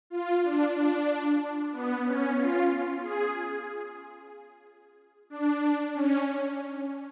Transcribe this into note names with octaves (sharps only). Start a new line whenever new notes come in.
F4
D4
D4
B3
C#4
F4
G#4
D4
C#4